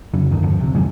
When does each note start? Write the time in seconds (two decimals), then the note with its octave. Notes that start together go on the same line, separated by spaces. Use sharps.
0.14 F1 F2 C#3 F#3
0.31 A#1 G2 D3 D#3
0.42 E2 G2 F3
0.59 E1 C#2 C3
0.75 F2 D#3 F#3 G#3